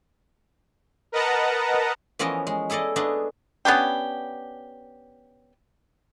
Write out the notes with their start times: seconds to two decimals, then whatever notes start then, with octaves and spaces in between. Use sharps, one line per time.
1.12 A#4 B4 D#5 F#5 A5 A#5
2.19 E3 F3 B3 C#4 A#4 D#5
2.47 G#3
2.70 E4 G#4 A4 D5 D#5
2.96 A3 B3 D4 G#4 D#5
3.65 B3 C#4 D4 G4